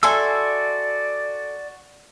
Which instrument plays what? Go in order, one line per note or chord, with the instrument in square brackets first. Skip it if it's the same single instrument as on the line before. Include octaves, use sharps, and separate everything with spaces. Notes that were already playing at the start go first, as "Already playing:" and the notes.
[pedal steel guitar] F#4 C6 E6 [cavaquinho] A4 E5 G#5 [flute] D5